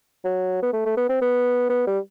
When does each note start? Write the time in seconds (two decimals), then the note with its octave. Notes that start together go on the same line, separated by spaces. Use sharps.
0.24 F#3
0.62 B3
0.73 A3
0.85 A3
0.97 B3
1.09 C4
1.22 B3
1.70 B3
1.87 G3